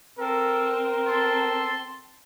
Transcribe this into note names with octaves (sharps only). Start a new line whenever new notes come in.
C4 A4 A#4
A4 A5 C6